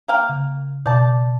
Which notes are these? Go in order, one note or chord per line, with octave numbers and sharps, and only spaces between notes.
A#3 F5 G5
C#3
B2 D5 A5 G6